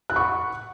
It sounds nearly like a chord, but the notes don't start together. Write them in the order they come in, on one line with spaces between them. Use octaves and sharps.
F#6 B5 C#6 F#5